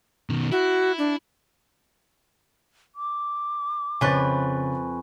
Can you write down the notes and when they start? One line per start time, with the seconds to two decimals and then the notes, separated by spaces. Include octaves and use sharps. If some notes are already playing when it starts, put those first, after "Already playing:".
0.30 B2 D#3
0.52 E4 F#4
0.98 D4
2.95 D6
4.01 F2 C#3 B4 G#5 B5 C#6 F#6 A6